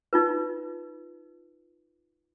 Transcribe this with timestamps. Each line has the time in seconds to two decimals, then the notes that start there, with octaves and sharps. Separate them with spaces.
0.13 D#4 F4 B4